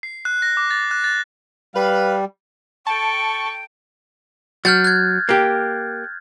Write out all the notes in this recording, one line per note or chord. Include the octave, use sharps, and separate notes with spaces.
C7
F#6
A#6
D6
A6
F#6
A6
G3 B4 F5
A4 G5 A5 C#6
F#3 F6 G6 A6
F#6 G#6
A#3 G4